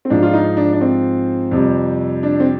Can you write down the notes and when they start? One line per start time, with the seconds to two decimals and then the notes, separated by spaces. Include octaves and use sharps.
0.05 C4
0.10 G#2 F3 D4
0.22 F4
0.34 D#4
0.57 D4
0.73 D4
0.81 C4
1.51 F2 C3 G3
2.23 D4
2.40 C4